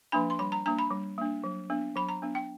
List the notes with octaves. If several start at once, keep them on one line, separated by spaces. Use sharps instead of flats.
F3 A#3 D4 B5
C6
G3 B5
A#5
A#3 D4 A#5
B5
G3
A#3 D4
F#3
B3 D4
F#3 B5
A#5
B3 D4
G5